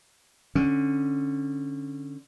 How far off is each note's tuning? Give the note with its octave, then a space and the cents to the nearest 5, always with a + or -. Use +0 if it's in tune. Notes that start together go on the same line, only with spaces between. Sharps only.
D3 +0 C#4 -10